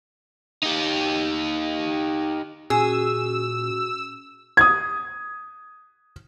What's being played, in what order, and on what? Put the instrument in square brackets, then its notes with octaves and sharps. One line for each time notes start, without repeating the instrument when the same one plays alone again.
[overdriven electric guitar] D#4 G4
[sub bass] A#2 [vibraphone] C#4 F#4 [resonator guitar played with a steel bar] G#4 [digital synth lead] E6
[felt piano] D#6 G#6